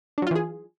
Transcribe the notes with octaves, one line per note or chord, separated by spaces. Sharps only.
E3 F#3 D4 F4 G#4